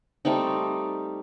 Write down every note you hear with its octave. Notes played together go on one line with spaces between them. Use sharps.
G3 A3 C4 D#4